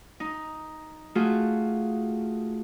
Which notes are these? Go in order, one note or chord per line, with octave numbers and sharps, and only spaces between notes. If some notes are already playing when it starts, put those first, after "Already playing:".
D#4
A3 F4 F#4 G#4